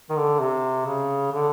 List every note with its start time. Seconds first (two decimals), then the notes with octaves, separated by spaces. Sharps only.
0.10 D#3
0.17 D3
0.40 C3
0.86 C#3
1.32 D3